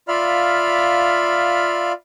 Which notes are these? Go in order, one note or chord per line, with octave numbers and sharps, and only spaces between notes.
F4 D5 E5 F5 B5 F6